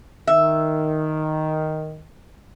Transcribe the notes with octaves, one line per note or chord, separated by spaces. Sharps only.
D#3 E5